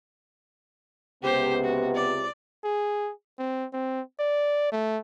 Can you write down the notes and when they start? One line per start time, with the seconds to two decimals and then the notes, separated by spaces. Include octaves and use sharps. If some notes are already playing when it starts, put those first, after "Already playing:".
1.23 C#2 C3 B3 G4 C5
1.64 F#4
1.95 D5
2.64 G#4
3.39 C4
3.73 C4
4.19 D5
4.72 A3